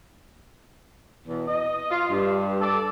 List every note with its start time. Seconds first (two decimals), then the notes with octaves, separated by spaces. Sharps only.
1.27 E2 B2
1.47 D#5
1.91 F4
2.11 G2
2.61 A4 D5